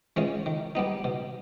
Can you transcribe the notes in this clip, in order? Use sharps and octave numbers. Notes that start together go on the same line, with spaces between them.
E3 G#3 C#4 F4
D#3
G3 B3 D#4
B2